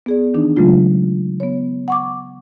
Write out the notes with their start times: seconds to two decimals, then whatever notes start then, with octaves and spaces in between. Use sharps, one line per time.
0.06 B3 G#4 D5
0.34 D#3 E3 D4 D#4
0.56 C#3 F#3 G#3 A3 F4
1.40 B3 C#5
1.88 F#5 C#6 D6